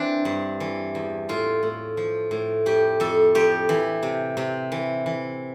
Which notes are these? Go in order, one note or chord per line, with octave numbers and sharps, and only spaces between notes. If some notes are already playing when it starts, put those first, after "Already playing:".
Already playing: E3 C4 D4
G2
E3
E2
A2 F4
A2
F3
A2
F2 G4
F2 A4
F2 G4
E3
C3
C3
E3
E3